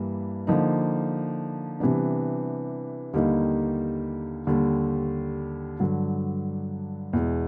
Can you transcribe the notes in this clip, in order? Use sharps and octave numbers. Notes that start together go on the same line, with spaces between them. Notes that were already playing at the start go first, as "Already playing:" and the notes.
Already playing: G2 E3 G3 A#3
D3 F3 A#3 D#4
C3 E3 G3 B3 D4
D#2 D3 G3 A#3 D#4
D#2 D3 G3
G2 D3 F#3
E2 B2 G#3